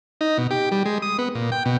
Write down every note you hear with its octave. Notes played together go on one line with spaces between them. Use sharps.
D#4
B2
G4
G3
G#3
D#6
B3
A#2
G5
B2